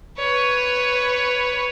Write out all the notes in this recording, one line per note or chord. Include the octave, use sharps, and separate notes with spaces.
B4 C#5